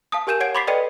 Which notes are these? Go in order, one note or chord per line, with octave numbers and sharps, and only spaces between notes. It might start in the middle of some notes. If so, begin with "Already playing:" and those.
F5 A5 D#6
G4 A#4 G#5 G6 D#7 E7
C#5 F#5 G#6 D7
B5 C6 D6 A6 B6 C7
A4 B4 D5 D#5 G5 D#7